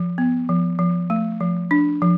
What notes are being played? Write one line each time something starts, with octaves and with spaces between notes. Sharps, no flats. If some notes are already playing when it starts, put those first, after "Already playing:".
Already playing: F3
B3
F3
F3
A3
F3
D4
F3